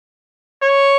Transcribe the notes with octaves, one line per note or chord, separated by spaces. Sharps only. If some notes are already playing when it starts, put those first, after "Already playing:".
C#5